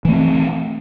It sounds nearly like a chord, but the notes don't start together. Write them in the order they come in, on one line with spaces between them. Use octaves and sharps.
E3 A3 C4